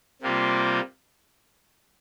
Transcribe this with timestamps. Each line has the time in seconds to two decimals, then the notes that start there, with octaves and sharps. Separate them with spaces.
0.22 C3 G3 A#3 F4